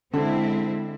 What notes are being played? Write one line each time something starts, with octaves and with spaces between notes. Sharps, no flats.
D3 G#3 C4 E4